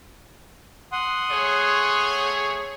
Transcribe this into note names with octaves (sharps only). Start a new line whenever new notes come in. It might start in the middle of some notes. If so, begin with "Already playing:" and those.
F#5 C6 D#6
A3 G#4 C#5